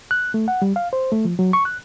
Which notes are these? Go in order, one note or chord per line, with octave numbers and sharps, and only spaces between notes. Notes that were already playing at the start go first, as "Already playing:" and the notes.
F#6
A3
F#5
G3
F5
C5
A3
F3
F#3
C#6
F#6